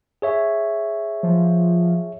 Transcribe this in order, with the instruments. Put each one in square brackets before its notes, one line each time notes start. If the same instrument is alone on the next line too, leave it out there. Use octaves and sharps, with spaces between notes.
[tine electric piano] G#4 C#5 E5
[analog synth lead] F3